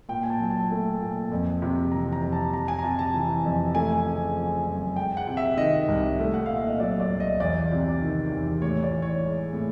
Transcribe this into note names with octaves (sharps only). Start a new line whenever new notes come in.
A#2 G5
G#5
A5
F#3
A5
A3
A#2
F2
C3
E3 A#5
A#5
F2
A5
F2 A#5
G#5
A#5
C3 A5
A5
E3
F2
A3 G#5
C#3
F3
F#2
G#3 G5
F#5
C3
E5
D#3 D#5
C2
A3
F#5
A#2 F5
E5
D#5
F#3 D5
D5
C2
D#5
E2 D5
C3
D#3
E2
A2 C#5
D5
E3
C#5
G#3
A2